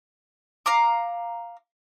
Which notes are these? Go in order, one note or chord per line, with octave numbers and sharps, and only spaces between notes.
F5 A#5 D6